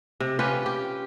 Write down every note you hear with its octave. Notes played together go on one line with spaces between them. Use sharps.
C3
C#4 F4 G4 B4
G4